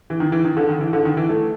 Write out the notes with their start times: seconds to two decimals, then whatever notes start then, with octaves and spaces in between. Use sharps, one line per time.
0.10 E3
0.20 D#3
0.32 E3
0.45 D#3
0.57 D3
0.69 D#3
0.81 E3
0.93 D3
1.05 D#3
1.17 E3
1.29 A3